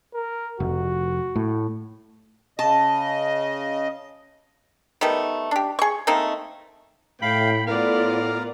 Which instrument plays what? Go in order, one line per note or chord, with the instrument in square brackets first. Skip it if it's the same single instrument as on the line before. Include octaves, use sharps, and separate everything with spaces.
[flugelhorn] A#4
[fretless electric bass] F1 [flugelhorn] F#4
[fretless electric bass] A2
[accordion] C#3 D#5 [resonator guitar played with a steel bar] A5
[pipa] D#3 G3 A3 B3
D4 G4
G#4 C#6
A3 A#3 C4 D#4
[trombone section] A2 [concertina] F5 [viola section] G5 [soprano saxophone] B5
[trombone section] A2 [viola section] B3 F4 D5 [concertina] A#4 [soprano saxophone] F5